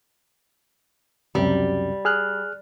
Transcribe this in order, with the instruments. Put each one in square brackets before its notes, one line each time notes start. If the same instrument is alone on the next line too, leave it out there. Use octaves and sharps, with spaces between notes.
[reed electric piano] C#2 F#2 C3 [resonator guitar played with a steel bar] G3
[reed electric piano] G#4 F6 F#6